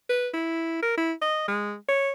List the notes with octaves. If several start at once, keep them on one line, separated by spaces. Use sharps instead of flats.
B4
E4
A#4
E4
D#5
G#3
C#5